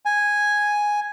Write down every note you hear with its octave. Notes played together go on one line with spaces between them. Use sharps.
G#5